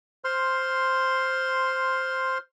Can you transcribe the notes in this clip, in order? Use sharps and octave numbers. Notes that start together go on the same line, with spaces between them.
C5 C6 F6